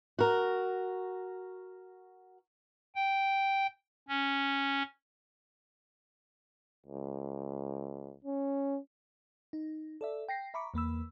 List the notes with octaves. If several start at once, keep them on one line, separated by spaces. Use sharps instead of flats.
F#4 A#4
G5
C#4
C#2
C#4
D#4
A4 D5 E5
G5 A#6 C7
E5 A#5 B5 C#6 D6
E2 A#3 B5 E6